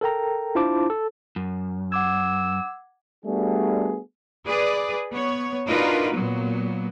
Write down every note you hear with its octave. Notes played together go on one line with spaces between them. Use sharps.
A4 A#4 G5 A#5
D4 E4 F4 C5 A5 D6
A4
F#2
F#5 D6 E6 G#6
G3 A3 B3 D4 F#4 G#4
G#4 B4 D5
B3 C#5
D4 D#4 F4 F#4 A#4 B4
A#2 F#3 B3